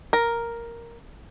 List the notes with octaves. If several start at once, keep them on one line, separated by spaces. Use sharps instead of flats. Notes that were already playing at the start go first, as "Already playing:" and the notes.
A#4